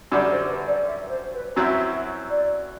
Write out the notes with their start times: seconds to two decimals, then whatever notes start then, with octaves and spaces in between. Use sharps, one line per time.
0.12 F#2 D3 G3 D5
0.31 C5
0.48 B4
0.67 D5
0.84 E5
1.03 B4
1.09 C5
1.33 B4
1.56 F#2 F#3 C4 E4 E5
2.29 D5